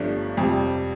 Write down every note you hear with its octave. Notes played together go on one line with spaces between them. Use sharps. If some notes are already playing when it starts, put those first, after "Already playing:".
Already playing: G1 G2 F3 A3 D4
F2 C3 G3